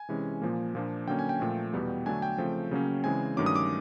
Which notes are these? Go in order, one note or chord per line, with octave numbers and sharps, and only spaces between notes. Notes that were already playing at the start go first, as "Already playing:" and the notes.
Already playing: G#5
C3 E3 G#3 C#4
A#2 F3 A#3
A#2 F3 A#3 D4
D3 F#3 A#3 C#4 G5
G#5
G5
A#2 F3 A3
E2 B2 G3 B3
D3 F#3 A3 D4 G#5
G5
C#3 F3 A3 C4
C#3 F#3 A#3 C#4
C#3 E3 G#3 C4 G#5
G2 D#3 F#3 A3 C#4 D6
D#6
D6